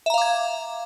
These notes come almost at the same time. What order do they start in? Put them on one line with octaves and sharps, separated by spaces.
E5 A#5 F5 D6 G#6